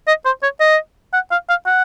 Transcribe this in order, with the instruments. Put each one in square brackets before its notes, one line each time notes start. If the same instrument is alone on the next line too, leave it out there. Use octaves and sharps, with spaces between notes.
[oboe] D#5
C5
C#5
D#5
F#5
F5
F5
F#5